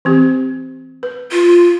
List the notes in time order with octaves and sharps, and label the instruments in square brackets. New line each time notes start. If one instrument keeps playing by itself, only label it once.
[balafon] E3 C4 G4
B4
[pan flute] F4